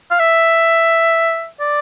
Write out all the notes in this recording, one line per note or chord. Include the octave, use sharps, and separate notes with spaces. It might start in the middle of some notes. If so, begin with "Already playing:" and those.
F5
E5
D5